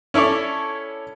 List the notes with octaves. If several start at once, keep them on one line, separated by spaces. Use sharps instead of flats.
C#4 E4 A4 C#5 D5